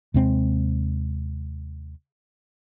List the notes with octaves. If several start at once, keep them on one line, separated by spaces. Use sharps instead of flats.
D#2 C3 G#3 C4